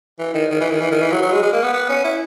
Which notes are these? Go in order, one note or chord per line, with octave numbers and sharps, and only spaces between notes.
E3
D#3
D#3
E3
D#3
E3
D#3
E3
F#3
F#3
G#3
G#3
A#3
B3
B3
C#4
E4